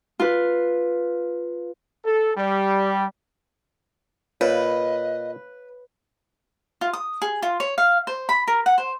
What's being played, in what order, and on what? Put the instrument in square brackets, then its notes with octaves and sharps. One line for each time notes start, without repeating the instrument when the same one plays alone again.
[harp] F4 B4
[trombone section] A4
G3
[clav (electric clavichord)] A#2 [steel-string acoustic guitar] B4 [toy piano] C#5 F5 [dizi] D#5
[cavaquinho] F4
D#6
G#4
F4
C#5
F5
C5
B5
A#4
F#5
C5